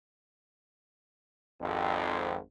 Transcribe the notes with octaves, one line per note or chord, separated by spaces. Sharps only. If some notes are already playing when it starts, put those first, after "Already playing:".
G#1 F2